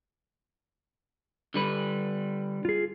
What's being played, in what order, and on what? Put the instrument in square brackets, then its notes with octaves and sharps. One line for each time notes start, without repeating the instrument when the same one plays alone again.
[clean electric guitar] D3 G3 B4
[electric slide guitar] F4 G#4